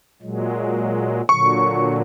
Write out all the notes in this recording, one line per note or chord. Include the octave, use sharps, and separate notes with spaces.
A#2 F#3 G#3
A#2 D3 F#3 C#6